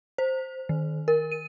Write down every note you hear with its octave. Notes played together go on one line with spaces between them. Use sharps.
C5
D#3
A#4
D#7